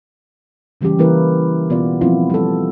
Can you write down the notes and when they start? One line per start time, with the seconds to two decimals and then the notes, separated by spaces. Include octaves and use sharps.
0.81 C#3 E3 G3 C#4 G4
0.99 E3 A#3 E4 A#4 B4
1.70 B2 B3 F4 D5
2.01 F3 G3 A#3 C4 E4 F4
2.30 G3 A4